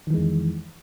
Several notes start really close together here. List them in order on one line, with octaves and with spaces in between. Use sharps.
D#3 E3 G#3 F2